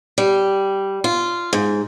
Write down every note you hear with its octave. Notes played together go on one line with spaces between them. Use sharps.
G3
F4
G#2